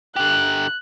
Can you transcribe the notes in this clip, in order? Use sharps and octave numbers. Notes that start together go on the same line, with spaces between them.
D3 G4 F#6